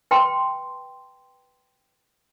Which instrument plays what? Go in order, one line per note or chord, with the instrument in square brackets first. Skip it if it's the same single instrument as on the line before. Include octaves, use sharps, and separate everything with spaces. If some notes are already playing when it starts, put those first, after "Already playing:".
[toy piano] B4 G5 A5 C6